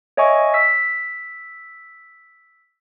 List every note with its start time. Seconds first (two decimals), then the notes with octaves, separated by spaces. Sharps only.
0.17 C#5 D#5 E5 G#5 C#6
0.54 E6 B6